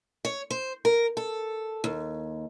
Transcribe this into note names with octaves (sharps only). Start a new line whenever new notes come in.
C#5
C5
A#4
A4
D#2